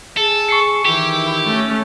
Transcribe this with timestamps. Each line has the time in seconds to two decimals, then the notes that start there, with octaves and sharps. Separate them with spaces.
0.17 G#4 A4
0.49 C#6 C7 C#7
0.85 D#3 E3 E4 G4
1.46 A3 C#4